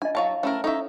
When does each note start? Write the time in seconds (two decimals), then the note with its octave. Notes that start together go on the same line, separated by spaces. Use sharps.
0.02 D4 F4 D#5 G#5
0.15 F#3 E4 C#5 D#5 F5 A5
0.43 A3 C#4 E4 A#4 C5 C#5
0.64 D#4 E4 A4 C#5 E5